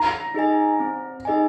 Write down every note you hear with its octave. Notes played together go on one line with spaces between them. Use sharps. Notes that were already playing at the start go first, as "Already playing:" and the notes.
Already playing: A#5
D#4 G#4 D#5 G#5
C4
D#4 G#4 D#5 G#5